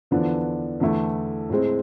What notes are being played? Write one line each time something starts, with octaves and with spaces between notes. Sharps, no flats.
E2 D3 F3 B3 D4
E2 D3 A3 E4
A2 G#3 C4